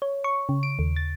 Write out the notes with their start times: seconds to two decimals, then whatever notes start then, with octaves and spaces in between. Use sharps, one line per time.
0.02 C#5
0.24 C#6
0.49 C#3
0.63 D7
0.79 D#2
0.96 A6